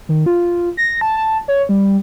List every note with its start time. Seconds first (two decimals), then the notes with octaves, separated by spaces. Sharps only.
0.09 D#3
0.26 F4
0.77 A#6
1.01 A5
1.17 A5
1.48 C#5
1.69 G3